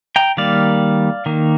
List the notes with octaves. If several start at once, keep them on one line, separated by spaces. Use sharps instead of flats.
G5 A#5
D#3 G3 A#3 D5 F5
D#3 A#3